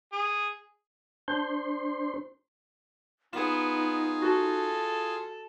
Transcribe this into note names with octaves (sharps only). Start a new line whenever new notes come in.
G#4
D4 C5 C6
B3 D#4 F4 G#4 F#5 E7
F#4 A4